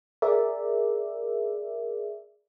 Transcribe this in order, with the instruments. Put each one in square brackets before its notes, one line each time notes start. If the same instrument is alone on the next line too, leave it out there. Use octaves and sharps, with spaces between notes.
[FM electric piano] G#4 A#4 D5 E5